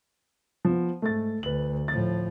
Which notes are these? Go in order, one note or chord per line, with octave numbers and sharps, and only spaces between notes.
F3 B3
G#2 A3 A6
D2 B4 F#7
A2 F3 A6